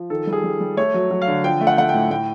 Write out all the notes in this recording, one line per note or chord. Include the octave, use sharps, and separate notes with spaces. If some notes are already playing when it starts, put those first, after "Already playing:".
Already playing: F3
D#3 A4
G3
G#4
G3
G3
A3 C#5
F#3
F#3
F5
D3
F3 G5
A3
F#5
A3 F#5
G5
A2
A2 G5